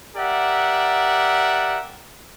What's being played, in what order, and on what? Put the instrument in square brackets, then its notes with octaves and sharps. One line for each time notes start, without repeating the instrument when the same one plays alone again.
[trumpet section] G4 A#4 D5 E5 F#5